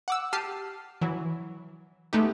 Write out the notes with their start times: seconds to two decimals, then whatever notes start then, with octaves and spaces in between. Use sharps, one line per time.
0.08 F#5 D6 E6
0.33 G4 A5 F6 C7 D#7
1.02 E3 F#3
2.13 G#3 A3 B3 D#4 G4